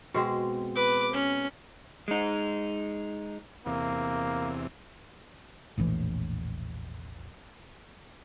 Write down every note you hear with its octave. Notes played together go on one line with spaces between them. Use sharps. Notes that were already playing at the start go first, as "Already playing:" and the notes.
B2 G#3 C4
B4 D6
C#4
G#3 D#4
E2 C3 A#3
E1 A#1 A2 E3